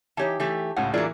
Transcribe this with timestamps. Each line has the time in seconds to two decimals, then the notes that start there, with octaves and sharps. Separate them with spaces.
0.17 E3 D#4 G4 C#5 A5
0.40 E3 A3 G4
0.76 C#2 A2 C#3 F#5
0.94 E3 F#3 A#3 D4 E4 F4 G#4 D5